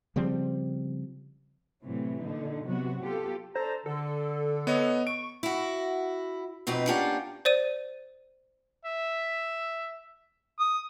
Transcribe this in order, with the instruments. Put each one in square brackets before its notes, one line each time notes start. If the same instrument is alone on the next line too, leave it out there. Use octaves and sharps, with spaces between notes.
[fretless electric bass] C#3 F3 G3 C4
[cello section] A2 C3 E3 F#3
A#2 D3 D#4
C3 F#3 B3 F#4
B3 F4 G4 A4
[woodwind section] D4 A4 A#5 [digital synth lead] C5
[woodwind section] D3 [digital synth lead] A4
[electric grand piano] B3 C#5 D#5
[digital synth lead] C#6 [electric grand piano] D7
[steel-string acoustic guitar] E4 F#4
F2 B2 C4 D#4 B4
A#3 C#4 D4 F4 G4 F#5
[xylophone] C5 D5 D#7
[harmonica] E5
D#6